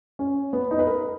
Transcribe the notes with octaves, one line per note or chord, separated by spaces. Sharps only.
C#4
B3
D#4
B4
A#4